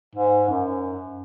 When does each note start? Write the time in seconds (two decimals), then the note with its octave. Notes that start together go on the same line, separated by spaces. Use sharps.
0.15 G#2
0.49 F#2